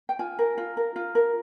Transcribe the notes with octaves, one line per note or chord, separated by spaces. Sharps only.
G5
F4 G#5
A#4
F4
A#4
F4
A#4